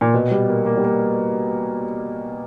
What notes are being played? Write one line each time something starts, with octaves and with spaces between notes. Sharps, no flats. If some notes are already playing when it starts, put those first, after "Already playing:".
A#2
B2
G3
A#3
A#3
G3
A#3